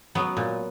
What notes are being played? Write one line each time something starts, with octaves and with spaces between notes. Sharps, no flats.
F#3 B3
A#2